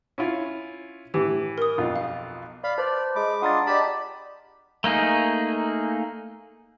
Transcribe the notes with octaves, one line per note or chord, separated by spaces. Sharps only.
C#4 E4 F4
A2 E3 G4
A#4 D#6
B1 F2 F4
F5
D5 F5 B5
B4 C5 D5 A5
G#3 G#4 D#5 B5 D6
D4 F4 F#5 A#5 D#6 A6
G4 D5 D#5 A5 B5 D6
A3 A#3 D#4 G#4